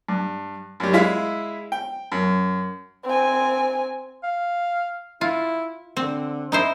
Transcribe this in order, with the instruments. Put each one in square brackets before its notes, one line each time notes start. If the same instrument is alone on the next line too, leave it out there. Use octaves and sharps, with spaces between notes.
[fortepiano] G2
F#2 G3
G#3 E4 E5 F5
G5
F#2
[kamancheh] C4 G#5
[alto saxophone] F5
[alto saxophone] E4 [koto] F4
[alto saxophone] D3 [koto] C4
[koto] D#4 E4 C5